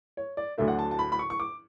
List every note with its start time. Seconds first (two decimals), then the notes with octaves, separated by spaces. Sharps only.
0.17 C#5
0.37 D5
0.58 D2 D3 F#3 A3 E5
0.68 F#5
0.79 A5
0.91 A5
0.99 B5
1.12 B5
1.19 C#6
1.30 C#6
1.40 D6